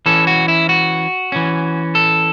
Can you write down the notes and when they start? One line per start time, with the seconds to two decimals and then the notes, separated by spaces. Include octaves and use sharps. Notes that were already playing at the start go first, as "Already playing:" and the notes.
0.06 E3 C#4 A4
0.27 F#4
0.48 E4
0.69 F#4
1.32 E3 C#4
1.95 A4